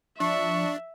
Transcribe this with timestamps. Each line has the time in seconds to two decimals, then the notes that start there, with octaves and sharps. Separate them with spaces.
0.20 F3 D4 E5 C#6